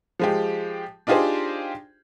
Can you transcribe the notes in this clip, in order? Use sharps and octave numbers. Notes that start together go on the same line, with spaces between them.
F3 G#3 G4
D4 D#4 F4 G4 G#4 C5